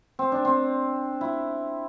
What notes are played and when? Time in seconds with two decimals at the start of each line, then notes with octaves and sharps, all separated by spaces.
0.19 C4
0.32 D4
0.45 C4
1.21 E4